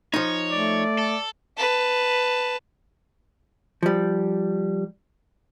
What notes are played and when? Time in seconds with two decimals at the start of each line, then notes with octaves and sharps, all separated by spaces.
0.14 F3 D#4 C#5
0.52 A3 D5
0.98 A4
1.57 B4 A5
3.83 F3 G3